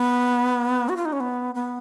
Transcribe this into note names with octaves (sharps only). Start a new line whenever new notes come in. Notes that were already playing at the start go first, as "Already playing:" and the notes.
Already playing: B3
F#4
F4
D#4
C#4
B3
B3